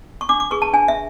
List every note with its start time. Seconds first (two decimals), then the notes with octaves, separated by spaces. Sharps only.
0.21 C#6
0.29 D4 D6
0.40 D6
0.51 G#4 B4 C#6
0.62 A5
0.73 D4 G#5
0.88 E5